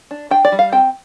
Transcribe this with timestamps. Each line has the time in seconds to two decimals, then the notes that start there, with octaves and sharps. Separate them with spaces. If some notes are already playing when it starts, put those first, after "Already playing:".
0.11 D4
0.31 D4 G5
0.45 D5
0.52 G3
0.59 F5
0.72 C4 G5